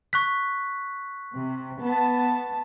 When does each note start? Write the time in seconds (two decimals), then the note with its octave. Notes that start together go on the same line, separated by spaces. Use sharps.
0.13 C#6 F#6 B6
1.34 C3
1.81 B3 A5